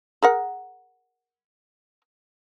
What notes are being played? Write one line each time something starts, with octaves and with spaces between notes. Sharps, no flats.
G#4 A#4 F#5